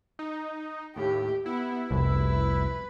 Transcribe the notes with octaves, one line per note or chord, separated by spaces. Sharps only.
D#4
D#2 A2 G4
B3 E4
F1 C2 B4